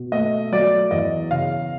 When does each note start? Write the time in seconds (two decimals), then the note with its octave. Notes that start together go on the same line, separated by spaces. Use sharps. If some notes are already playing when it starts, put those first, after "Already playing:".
Already playing: B2
0.12 A3 D#5
0.52 F#3 D5
0.91 E2 D#5
1.31 C#3 F5